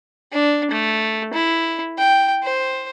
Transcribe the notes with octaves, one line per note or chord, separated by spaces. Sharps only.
D4
A3
E4
G5
C5